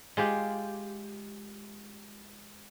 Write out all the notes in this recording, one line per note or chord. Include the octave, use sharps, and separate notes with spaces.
G#3 F4 G4